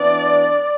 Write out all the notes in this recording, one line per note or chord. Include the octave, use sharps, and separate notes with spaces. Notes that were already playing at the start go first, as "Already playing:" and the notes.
Already playing: E3 B3 D4 D5